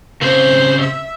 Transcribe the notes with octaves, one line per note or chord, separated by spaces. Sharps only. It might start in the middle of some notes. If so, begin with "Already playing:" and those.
C#3 C4 C5
E5